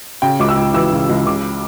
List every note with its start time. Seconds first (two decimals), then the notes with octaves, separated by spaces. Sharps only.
0.22 C#3 G5
0.40 C#2 D6
0.49 E6
0.57 C#2
0.74 E3 E6
0.92 C#3
1.10 C#2
1.26 C#3 D6